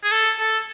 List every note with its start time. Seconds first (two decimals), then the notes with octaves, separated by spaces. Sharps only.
0.04 G#4
0.12 A4
0.40 A4